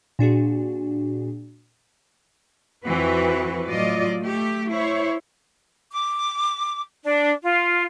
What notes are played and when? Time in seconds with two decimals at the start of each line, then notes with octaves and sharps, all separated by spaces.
0.19 A#2 D4 F#4 G#4
2.84 F2 E3 C4 F#4 B4
3.69 A2 F#3 F4 D5 D#5
4.20 A3 G4
4.72 E4 C5 C#5
5.91 D6
7.05 D4
7.42 F4